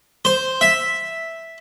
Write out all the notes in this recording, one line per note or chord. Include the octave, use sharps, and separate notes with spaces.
C5
E5